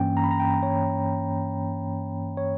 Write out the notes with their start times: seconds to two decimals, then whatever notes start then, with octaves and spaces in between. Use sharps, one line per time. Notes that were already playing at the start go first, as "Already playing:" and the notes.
Already playing: G2 E3 A#3 C#4 G5
0.17 A#5
0.24 B5
0.31 A#5
0.40 G5
0.63 C#5
2.37 C#5